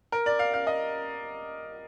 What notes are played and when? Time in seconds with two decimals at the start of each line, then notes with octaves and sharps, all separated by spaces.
0.12 A#4
0.26 D5
0.39 F5
0.54 F5
0.67 D#5